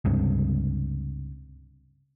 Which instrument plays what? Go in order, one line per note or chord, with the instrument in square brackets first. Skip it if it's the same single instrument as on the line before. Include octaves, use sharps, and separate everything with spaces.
[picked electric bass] C#2 G2 C3